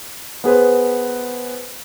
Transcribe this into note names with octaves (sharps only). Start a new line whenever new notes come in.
B3 G#4 B4 C5